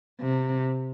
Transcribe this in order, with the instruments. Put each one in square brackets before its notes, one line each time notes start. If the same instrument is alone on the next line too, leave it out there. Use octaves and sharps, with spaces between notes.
[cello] C3